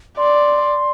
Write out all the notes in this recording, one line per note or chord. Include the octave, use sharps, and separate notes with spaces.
D5 C6